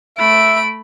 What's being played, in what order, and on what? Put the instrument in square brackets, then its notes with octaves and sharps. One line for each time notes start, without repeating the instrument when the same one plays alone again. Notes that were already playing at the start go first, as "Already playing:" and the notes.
[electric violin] A3 B5 [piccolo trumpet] E5 [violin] D7